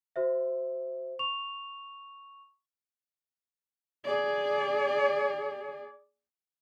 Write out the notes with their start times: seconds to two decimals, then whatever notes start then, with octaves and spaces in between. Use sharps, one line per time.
0.16 F#4 C5 E5
1.19 C#6 F7
4.05 G#4 D5